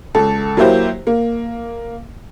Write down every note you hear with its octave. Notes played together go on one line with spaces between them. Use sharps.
C#2 A4
F#3 A#3 E4 G4 C5
A#3